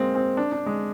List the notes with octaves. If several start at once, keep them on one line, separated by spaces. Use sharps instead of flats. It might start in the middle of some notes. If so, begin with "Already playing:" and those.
Already playing: G#3 A#3 C4
C4
D4
D4
G#3